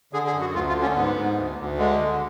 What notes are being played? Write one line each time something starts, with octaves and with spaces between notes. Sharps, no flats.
D3 G#4
G#4
F#2
F#4
D2 F4
F4
D3
C#4
G#2 B3
G#2
D2
D2
D3 G#3
D3